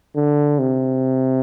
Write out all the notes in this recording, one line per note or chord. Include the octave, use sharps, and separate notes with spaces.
D3
C3